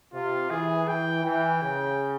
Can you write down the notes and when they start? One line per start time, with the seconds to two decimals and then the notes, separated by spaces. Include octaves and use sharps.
0.14 C3 F4
0.50 E3 G#4
0.88 E3 G5
1.25 E3 G5
1.62 C#3